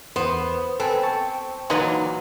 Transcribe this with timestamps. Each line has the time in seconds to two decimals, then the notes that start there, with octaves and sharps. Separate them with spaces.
0.16 E2 B3 C5
0.80 C4 A4 B4 G#5
1.03 A5 C#6
1.70 A#2 E3 F#3 D#4 B4 D#5